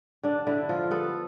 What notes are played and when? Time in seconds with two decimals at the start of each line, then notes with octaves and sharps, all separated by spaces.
0.23 D3 D4
0.47 D3 E4
0.69 F3 F4
0.91 B3 A4